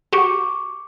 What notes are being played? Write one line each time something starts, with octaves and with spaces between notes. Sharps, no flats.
F#4 G4 C#6 D6 G6